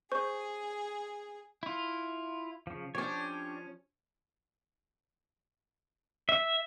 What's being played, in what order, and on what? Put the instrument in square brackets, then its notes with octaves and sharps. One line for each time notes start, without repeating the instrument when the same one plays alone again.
[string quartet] G#4 [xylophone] C5 C#6 G6
[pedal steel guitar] E4 F4
C#3 F3
[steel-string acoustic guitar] F3 C#4 [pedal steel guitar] D4 G4 C#5
[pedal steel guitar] E5